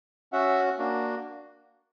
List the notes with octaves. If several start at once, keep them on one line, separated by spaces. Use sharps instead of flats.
C#4 F#4 E5 F#5
A#3 D4 F#4